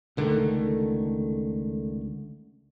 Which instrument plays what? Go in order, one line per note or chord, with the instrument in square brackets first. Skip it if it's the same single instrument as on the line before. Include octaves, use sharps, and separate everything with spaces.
[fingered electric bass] C#2 D3 D#3 A3